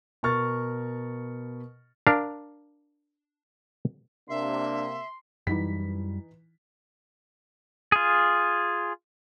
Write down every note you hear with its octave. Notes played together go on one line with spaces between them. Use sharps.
B2 A#4 C#6 F6 A6
D4 A#4 F5
C3 A#3 D4 E5 C6
F#2 E3 G3 D#4 B6
F4 G#4